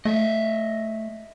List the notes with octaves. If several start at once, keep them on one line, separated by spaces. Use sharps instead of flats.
A3 D#5 E5